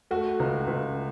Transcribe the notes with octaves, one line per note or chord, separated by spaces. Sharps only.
A3 F#4
C#2
C#2